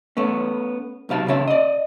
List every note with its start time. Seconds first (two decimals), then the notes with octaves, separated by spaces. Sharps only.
0.17 A3 B3 C#4
1.09 B1 C3 F5 A5
1.28 C#3 C#4 E5 A5
1.48 D5 D#5